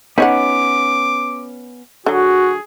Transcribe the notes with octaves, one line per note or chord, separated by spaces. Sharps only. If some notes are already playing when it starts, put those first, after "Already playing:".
B3 C#4 D#4 C#5 F#5 D6
D3 F#3 F#4 G#4